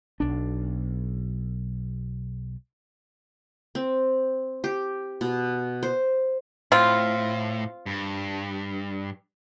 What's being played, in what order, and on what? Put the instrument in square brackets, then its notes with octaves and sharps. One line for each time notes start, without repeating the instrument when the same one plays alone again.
[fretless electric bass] B1 D4
[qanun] C4
G4
B2
C5
[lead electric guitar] A2 [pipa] C4 F4
[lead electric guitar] G2